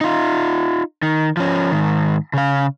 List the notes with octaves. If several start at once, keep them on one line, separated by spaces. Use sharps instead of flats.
D#4 F4
D#3
F3 C#4
G#2 D#3
C#3 F5